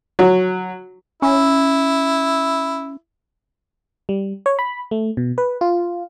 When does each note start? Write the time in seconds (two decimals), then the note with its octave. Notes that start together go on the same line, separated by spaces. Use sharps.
0.19 F#3
1.22 C#4 E4
4.09 G3
4.46 C#5
4.59 B5
4.91 A3
5.17 B2
5.38 B4
5.61 F4